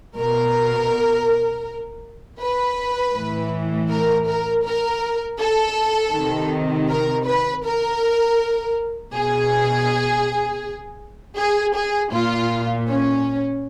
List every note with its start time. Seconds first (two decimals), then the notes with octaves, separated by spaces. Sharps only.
0.15 B2 A#4
2.40 B4
3.14 A2 E3
3.89 A#4
4.27 A#4
4.64 A#4
5.39 A4
6.14 C3 D#3
6.88 A#4
7.26 B4
7.63 A#4
9.13 B2 G#4
11.37 G#4
11.74 G#4
12.12 A#2 F4
12.87 C#4